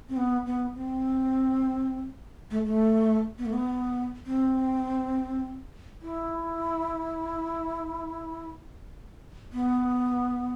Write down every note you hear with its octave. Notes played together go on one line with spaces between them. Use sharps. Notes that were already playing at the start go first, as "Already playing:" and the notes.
C4
B3
B3
C4
A3
A3
B3
A3
B3
C4
E4
B3